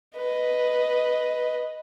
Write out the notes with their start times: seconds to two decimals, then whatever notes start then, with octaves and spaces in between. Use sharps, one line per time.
0.16 B4 D#5